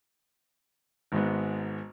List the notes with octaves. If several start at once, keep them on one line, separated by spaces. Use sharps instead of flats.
G#1 G#2 G#3 B3